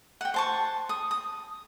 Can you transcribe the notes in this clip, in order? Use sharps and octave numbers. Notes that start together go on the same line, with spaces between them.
F#5 G5
C5 A5 C#6
D#6
D#6